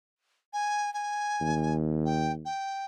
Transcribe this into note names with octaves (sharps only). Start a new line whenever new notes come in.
G#5
G#5
D#2
G5
G5